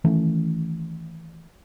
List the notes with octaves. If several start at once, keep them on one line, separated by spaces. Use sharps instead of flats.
D#3 E3 A3 C#4